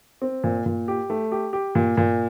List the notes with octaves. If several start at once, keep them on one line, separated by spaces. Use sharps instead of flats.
C4
A#2
A#2
G4
A3
G4
G4
A#2
A#2